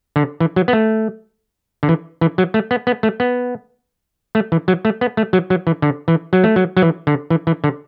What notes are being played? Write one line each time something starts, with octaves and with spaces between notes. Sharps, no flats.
D3
E3
F#3
B3
A3
D3
E3
E3
F#3
A3
B3
B3
A3
B3
A3
E3
F#3
A3
B3
A3
F#3
F#3
E3
D3
E3
F#3
A3
F#3
F#3
E3
D3
E3
E3
D3